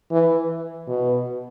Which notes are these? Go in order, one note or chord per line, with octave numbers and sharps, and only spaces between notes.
E3
B2